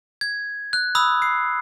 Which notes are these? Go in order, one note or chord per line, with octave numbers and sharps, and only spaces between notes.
G#6
F#6
B5 D#6 E6
C7